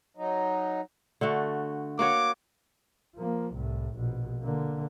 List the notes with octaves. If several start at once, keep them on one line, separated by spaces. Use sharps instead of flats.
F#3 D#4
D3 A3 F#4
A#3 F#4 C#5 D6
F3 A#3
C2 A2
A#1 B2
D3 A#3